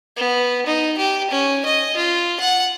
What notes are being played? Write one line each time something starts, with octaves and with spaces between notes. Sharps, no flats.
B3
D#4
G4
C#4
D#5
F4
F#5